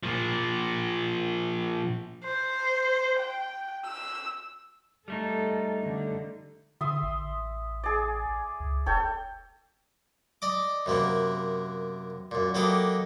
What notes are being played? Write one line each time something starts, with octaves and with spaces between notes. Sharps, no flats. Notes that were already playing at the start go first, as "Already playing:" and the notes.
A#2 F3
C5
G5
E6
G3 A3 D#4 A4
D3
D3 E5 C6 D#6
A1
G#4 D5
C#2
E1 A4 C#5 G5
D5 D#5 D6
F#2 C3 A#3 B3
F#2 A#2
F#3 A#3 B3 G4 A4 D#5